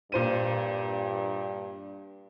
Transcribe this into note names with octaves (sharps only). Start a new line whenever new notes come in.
G2 A#2 C5 D#7